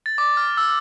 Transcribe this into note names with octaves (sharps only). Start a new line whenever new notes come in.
A6
D6
F6
E6